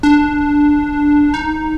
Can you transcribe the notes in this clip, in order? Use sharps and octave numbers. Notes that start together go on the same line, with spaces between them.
D4
D#4